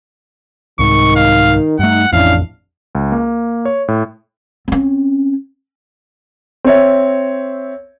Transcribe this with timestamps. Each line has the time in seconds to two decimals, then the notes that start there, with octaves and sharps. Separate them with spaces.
0.79 C2 G#2 D#3 C#6
1.16 F5
1.79 G2 A3 D#4 F#5
2.13 A1 F2 C#4 D4 E4 F5
2.95 C#2
3.12 A#3
3.65 C#5
3.88 A2
4.68 C4 C#4
6.64 C4 C#5 E5